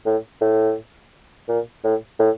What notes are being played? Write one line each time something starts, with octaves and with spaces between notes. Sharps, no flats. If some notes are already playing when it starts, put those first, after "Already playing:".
A2
A2
A#2
A2
A2